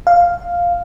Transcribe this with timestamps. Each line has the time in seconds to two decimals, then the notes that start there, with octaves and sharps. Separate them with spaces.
0.07 F5